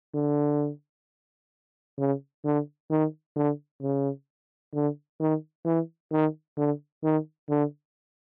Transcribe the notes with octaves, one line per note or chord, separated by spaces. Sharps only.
D3
C#3
D3
D#3
D3
C#3
D3
D#3
E3
D#3
D3
D#3
D3